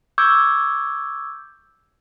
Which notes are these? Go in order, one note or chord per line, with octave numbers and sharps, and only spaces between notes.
C#6 D6 E6 G6 G#6